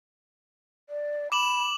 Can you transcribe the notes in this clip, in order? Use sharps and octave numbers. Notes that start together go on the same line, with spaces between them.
D5
B5 D6 E7 F#7